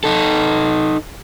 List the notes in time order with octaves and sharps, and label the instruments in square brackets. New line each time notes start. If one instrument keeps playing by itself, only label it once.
[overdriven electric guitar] D#4 A4